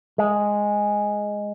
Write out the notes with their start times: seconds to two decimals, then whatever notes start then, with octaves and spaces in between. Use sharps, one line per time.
0.18 G#3